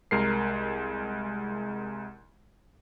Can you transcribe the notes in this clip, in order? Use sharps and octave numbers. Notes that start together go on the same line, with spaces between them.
C2 G#3 A#4 C7